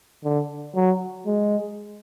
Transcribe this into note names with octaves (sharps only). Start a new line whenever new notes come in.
D3
F#3
G#3